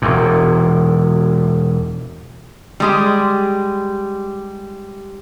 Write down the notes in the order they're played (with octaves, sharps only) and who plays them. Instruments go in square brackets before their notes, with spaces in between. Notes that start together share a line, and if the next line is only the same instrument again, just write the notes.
[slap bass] E1 E2 A#2
[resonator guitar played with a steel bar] G3 G#3 G4